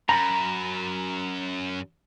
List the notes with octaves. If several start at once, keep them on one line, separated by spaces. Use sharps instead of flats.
F#2 A#5 B5